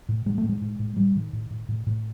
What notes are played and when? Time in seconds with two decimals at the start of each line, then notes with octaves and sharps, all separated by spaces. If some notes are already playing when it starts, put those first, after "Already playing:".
0.09 A2
0.26 A2 G#3
0.38 A3
0.43 A2
0.49 G#3
0.62 A2
0.79 A2
0.97 A2 G3
1.15 A2 D#3
1.33 A2
1.50 A2
1.69 A2
1.87 A2